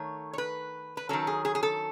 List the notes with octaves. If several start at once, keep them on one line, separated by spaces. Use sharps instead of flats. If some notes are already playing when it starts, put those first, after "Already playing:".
Already playing: D#3 A3 C#5
C#5
B4
B4
D#3 F#3 C#4 A4
G#4
G#4
G#4
A4